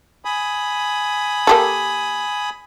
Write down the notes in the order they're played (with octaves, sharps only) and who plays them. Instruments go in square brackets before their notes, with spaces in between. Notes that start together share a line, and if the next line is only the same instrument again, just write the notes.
[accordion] G#5 B5 D#6
[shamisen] A#3 G4 A4